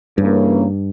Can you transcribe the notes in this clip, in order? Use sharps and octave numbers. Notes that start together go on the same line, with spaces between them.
G2 C#3 E3 A#3 C#4